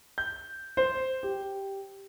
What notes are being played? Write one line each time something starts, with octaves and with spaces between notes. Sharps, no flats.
G6
C5
G4